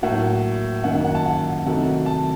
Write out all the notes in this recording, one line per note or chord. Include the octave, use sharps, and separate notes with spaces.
A2 F#3 A#3 F#5
F#2 D#3 A#3 F#5
F#5
F#5
A5
F#5
C3 D#3 F#3 A3 F#5
A5